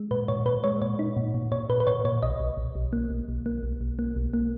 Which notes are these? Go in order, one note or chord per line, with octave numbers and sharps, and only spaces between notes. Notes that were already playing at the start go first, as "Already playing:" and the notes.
Already playing: G#3
A#2 B4
A#2 C#5
A#2 B4
G#3 C#5
A#2 C#5
D#4
A#2
A#2
A#2 C#5
A#2 B4
B4
A#2 C#5
A#2 C#5
B1 D#5
B1
B1
B1
A#3
B1
B1
A#3
B1
B1
A#3
B1
A#3